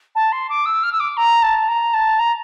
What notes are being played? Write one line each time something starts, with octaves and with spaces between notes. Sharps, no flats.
A5
C6
D6
E6
F6
E6
D6
A#5
A5
A#5
A5
A#5